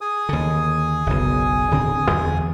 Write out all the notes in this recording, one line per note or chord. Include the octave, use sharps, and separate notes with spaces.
G#4 G#5 D#6
D#2 D3
F#1 B1
D1 D3 C4
E2